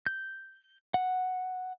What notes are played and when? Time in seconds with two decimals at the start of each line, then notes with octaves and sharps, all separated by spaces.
0.06 G6
0.94 F#5